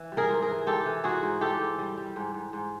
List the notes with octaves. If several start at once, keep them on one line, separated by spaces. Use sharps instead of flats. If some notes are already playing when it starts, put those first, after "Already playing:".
Already playing: E3
G3
G#4 A#4
G#2
G#4 A#4
E3
G#2 G4 A4
E3
G#2 F#4 G#4
G#2
G#2 G4 A4
G#2
G3
G3
G#2
G#2
G#2